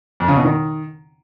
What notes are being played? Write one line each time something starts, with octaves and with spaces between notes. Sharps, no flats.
F2
C#3
B2
D#3